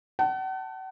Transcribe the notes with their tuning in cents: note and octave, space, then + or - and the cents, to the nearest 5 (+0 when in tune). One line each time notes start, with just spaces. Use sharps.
F#5 +40 A5 +5